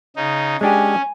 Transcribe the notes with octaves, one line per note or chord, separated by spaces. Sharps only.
C#3 D#4
G#3 C#4 D4 G4 G#5